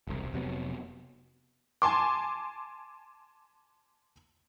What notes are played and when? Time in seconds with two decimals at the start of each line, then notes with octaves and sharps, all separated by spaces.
0.07 E1 C2
0.33 F1 C3 F#3 B3
1.82 G#5 A5 C6 D6